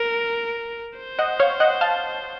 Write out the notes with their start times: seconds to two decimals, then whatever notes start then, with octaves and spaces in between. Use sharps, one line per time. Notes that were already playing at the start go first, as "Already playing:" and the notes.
Already playing: A#4
0.97 C5
1.19 D#5 F#5
1.39 C#5 F5
1.60 D#5 F#5
1.81 F5 A5